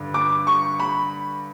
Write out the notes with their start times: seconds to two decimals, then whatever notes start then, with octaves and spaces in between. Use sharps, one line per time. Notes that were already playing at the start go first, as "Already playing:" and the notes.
Already playing: G2 D3
0.14 D6
0.47 C#6
0.80 B5